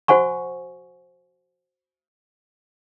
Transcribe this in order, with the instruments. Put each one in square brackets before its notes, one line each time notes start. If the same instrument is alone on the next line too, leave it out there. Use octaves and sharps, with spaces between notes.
[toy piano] F#4 C5 F#5 G#5 C#6